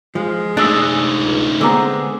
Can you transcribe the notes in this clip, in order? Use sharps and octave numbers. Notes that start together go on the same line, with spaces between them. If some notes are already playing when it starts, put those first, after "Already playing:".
F3 G#3
A3 D4 D#4 D#6 E6 F#6
C#2
D3 G#3 B3 C4 A#5 D6 E6